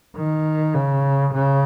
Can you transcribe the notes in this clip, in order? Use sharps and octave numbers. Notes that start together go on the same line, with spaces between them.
D#3
C#3
C#3